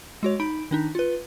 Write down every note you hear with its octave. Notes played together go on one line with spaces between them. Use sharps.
G#3 F#4 C#5
D#4 B5 D7
D#3 D4 D#4
F4 B4